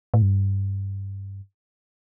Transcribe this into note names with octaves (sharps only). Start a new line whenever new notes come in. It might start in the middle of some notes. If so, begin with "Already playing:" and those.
A2
G2